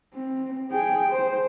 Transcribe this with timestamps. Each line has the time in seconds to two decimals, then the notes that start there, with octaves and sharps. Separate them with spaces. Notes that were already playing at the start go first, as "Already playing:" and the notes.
0.14 C4
0.71 G#4 G5
1.11 C5